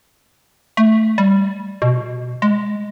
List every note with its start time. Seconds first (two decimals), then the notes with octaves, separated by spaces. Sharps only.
0.77 A3
1.18 G3
1.82 B2
2.42 G#3